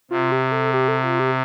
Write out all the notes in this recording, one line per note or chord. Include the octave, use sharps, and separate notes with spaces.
C3 F4
G4
A4
G4
A4
F4
G4